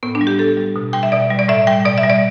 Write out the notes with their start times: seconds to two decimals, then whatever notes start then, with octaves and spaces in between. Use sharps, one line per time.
0.03 A2 B3
0.15 D4
0.21 G3
0.27 G4
0.39 A2 A4
0.57 G3
0.76 B2
0.93 G3 G5
1.03 E5
1.12 B2 D5
1.30 G3
1.39 D5
1.48 A2 E5
1.67 G3 G5
1.85 B2 D5
1.98 E5
2.03 G3
2.10 D5